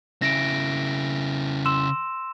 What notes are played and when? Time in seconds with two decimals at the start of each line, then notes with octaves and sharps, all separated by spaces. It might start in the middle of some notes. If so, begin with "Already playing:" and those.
0.22 C#3 E4 A#6 D7
1.66 C6 E6 E7